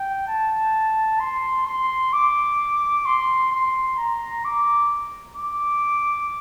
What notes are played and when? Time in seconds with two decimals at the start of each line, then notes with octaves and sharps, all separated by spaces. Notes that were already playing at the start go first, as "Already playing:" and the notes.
Already playing: G5
0.28 A5
1.19 C6
1.66 C6
2.13 D6
3.06 C6
3.52 C6
3.97 A#5
4.45 D6
5.36 D6